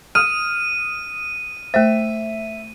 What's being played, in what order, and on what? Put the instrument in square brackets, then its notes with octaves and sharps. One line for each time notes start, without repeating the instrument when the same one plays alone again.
[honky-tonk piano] D#6 F6 [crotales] D#7
[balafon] A3 C5 [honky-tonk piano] E5